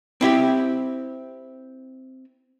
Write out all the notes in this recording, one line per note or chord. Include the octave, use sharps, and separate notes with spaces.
C4 E4 G4 E5